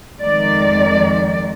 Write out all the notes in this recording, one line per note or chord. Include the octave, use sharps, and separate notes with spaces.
F2 D#3 G#3 D5